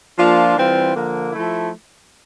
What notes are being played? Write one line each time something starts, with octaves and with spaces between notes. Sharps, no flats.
F3 A#3 D4 F4
E3 G3 C4 F4
D3 F3 A#3
F3 A3 E4